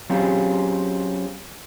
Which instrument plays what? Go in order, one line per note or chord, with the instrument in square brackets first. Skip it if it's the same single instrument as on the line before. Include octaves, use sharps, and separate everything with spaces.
[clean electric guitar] F#3 C4 C#4 F4 G4 G#4